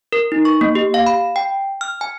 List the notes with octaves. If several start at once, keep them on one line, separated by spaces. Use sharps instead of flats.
A#4
D#4
C#6
A#3
G4
F5
B5
G5
F6
G#5